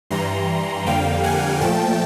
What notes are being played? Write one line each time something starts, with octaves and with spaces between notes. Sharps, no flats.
G2 E3 G3 A#5 C6
F2 D3 G3 A#3 F5 G5
F#5 G#5
A#2 F3 A3 G5 A5